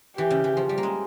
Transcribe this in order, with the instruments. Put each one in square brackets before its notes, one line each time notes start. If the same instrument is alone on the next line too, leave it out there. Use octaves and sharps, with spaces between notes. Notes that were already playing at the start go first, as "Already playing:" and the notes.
[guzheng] E3 [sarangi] G4
[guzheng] C#3
E3
F3
G3
A#3
G#3